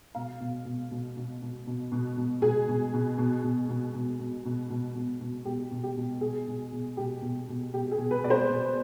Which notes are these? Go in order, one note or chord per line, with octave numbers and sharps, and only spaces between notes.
B2 F5
B2
B2
B2
B2
B2
B2
B2
B2
B2 G#4
B2
B2
B2
B2
B2
B2
B2
B2
B2
B2
B2
B2 G4
B2
G4
B2
B2 G#4
B2
B2
B2 G4
B2
B2
B2 G4
G#4
B2
B4
B2 D5
C5
B2